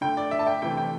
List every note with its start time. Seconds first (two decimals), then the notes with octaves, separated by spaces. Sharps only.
0.01 D3 A3 G5
0.17 D5
0.31 E5
0.39 A5
0.47 G5
0.62 C3 E3 A3 G5
0.77 G5